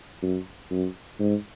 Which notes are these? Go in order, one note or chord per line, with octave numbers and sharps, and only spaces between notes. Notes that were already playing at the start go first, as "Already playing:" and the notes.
F#2
F#2
G#2